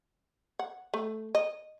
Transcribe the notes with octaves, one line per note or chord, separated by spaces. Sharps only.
F#5
A3
D#5